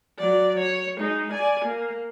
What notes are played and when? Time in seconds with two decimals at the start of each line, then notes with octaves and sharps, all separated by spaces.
0.19 F#3 D5
0.60 C#5
0.98 G#3 D#4
1.32 D5 G#5
1.65 A#3